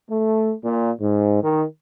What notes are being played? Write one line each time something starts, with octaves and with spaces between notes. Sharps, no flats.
A3
A#2
G#2
D#3